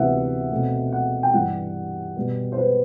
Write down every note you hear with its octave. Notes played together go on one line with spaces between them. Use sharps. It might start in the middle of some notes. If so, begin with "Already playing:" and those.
Already playing: D2 C3 E3 B3 E5 F#5
B2 A3 C4
F#5
G5
G2 E3 G3 F#5
B2 G3 B3
C5
B4